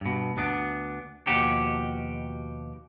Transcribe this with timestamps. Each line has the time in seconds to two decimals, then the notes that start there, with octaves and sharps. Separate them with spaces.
0.01 G2 B2
0.37 D2 B3 D4
1.27 D#2 B2 F3 F#4 G4